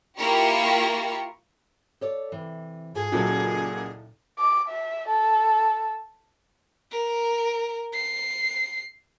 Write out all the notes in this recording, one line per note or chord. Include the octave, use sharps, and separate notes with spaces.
A#3 E4 F4 G4 A#4 C#6
A4 C#5 D5
C3 E3
G#2 F4 G#4 A4
C#2 A#2 F#3 D#4 E4 A4
D6
E5
A4
A#4
C7